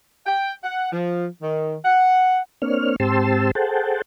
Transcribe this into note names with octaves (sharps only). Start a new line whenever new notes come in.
G5
F#5
F3
D#3
F#5
A#3 C4 D4 C#5 F6
G#2 C4 G4 A5 C6 E6
G#4 A4 C5 F#5 G5 A5